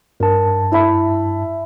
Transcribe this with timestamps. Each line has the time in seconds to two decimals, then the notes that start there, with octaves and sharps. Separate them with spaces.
0.20 G2 A#4 A5
0.72 E4 E5 B5